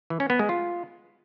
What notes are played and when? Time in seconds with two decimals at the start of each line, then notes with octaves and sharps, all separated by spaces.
0.10 E3
0.20 C#4
0.30 B3
0.39 G#3
0.49 F4